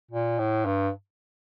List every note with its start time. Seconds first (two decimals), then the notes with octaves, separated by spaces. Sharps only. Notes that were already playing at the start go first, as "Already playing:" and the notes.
0.11 A#2
0.39 A2
0.65 G2